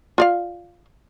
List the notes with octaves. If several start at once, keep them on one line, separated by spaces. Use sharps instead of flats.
F4 D5 F5